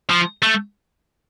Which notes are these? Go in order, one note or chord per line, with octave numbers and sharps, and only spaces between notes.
F3
A3